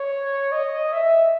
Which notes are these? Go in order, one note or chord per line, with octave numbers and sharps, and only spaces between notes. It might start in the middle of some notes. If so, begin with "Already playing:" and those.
Already playing: C#5
D#5
E5